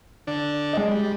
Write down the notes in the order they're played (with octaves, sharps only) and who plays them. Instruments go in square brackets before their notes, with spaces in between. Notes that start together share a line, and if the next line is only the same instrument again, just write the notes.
[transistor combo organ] D3 D4
[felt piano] G#3 D#5
[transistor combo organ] G3